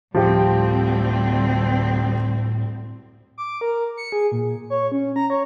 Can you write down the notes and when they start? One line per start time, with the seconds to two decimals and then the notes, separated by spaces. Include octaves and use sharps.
0.15 D2 A2 F3 G3 C4 G4
3.38 D6
3.61 A#4
3.97 C#7
4.12 G#4
4.32 A#2
4.70 C#5
4.92 C#4
5.16 A#5
5.30 C#5